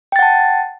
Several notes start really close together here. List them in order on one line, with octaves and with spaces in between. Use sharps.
G5 A6 F#5 A5